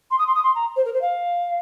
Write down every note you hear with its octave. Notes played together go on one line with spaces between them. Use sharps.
C6
D#6
C6
D#6
C6
A#5
C5
A#4
C5
F5